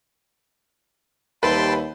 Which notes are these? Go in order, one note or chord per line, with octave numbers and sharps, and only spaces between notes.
D#2 C3 G3 A3 B4 G5 A5 C6